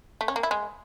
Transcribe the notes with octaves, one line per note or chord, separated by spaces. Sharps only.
A3
C#4
A#3
E4
G#3